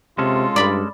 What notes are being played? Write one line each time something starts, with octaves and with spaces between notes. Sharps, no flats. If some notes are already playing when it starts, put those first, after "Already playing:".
C3 G#3 C#4 F4 A4
G2 D5 B5